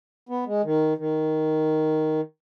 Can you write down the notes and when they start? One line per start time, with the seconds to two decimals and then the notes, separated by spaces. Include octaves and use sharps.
0.29 B3
0.46 G#3
0.63 D#3
0.97 D#3